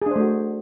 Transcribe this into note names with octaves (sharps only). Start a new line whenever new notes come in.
A3 D4 F#4 G#4 C5